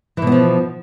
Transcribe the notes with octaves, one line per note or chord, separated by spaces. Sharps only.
B2 E3 F3 B3